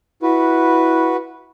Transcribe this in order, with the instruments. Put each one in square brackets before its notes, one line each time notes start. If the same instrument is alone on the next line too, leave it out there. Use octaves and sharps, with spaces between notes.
[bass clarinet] E4 [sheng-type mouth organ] F#4 B4